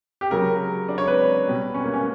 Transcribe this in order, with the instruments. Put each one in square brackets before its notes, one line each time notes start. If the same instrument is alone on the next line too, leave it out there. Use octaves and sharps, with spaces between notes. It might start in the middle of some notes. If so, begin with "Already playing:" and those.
[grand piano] G4
C#3 F#3 A#4
D4
C#5
B4
B2 G3
C#4
A#3
C#4